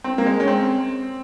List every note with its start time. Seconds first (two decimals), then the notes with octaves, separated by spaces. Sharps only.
0.04 C4
0.18 A#3
0.26 G#3
0.40 C#4
0.48 C4